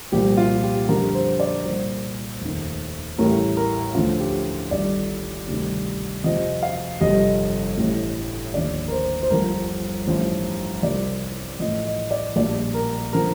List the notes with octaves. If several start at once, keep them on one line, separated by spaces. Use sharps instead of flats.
C2 A#2 F3 G4
F4
G4
F2 D3 G3 A#4
C5
D5
C2 A#2 G3 C5
F1 D#2 D#3
A1 A2 G3 A#4
A#4
D2 D3 F3 F4
G4
G1 G2 D#3 G3 D5
D2 C3 D#3 G3
F2 C3 F3 D#5
F5
G1 F2 C3 G3 D#5
A1 A2 G3
D#2 D3 F3 D5
A#4
C5
C5
G1 G2 F3 A#4
A1 G2 F3
C2 C3 F3 D5
A1 A2 F3 D#5
D#5
D5
A#1 A#2 G3 D5
A#4
D3 F3 A#4